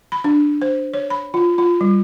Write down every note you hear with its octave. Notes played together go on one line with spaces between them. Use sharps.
B5
D4
C5
C#5
B5
F4
F4
G3